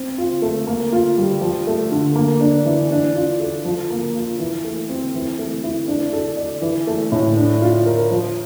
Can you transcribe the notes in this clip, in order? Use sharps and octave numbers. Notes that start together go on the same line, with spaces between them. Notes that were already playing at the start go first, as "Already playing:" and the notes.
Already playing: C4
F4
A3
A#3
F4
G3
F3
A3
D3
A#3
D4
E3
D4
F4
A4
F3
A#3
F4
E3
A3
C4
E3
A3
E4
D4
A4
D5
E3
A3
A2
D4
F4
A#4
F3